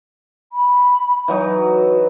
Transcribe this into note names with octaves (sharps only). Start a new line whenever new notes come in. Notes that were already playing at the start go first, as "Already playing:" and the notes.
B5
E3 F#3 D#4
F#4